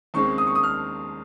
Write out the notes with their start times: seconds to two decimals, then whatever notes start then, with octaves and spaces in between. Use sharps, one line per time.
0.14 D#2 C#3 G#3 C4 C#6
0.38 D#6
0.47 C#6
0.55 D#6
0.63 F6